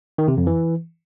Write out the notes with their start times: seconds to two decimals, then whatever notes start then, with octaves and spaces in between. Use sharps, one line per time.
0.18 D#3
0.28 C3
0.37 F2
0.47 E3